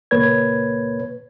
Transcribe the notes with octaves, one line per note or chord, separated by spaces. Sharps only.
C#2 A#2 A#3 B4 C#5 G#6